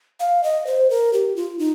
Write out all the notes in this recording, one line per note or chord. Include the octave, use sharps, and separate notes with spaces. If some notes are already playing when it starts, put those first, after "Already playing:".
F5
D#5
C5
A#4
G4
F4
D#4